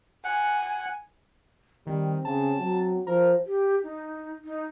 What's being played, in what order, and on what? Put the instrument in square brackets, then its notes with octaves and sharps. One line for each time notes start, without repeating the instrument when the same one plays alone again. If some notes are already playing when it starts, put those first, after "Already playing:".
[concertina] F#5 [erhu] G#5
[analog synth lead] D#3 [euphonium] G3 [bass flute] C4
[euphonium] C#3 [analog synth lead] A5
[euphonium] F#3
[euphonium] F3 [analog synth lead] A#4 [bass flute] C5
[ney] G4
D#4
D#4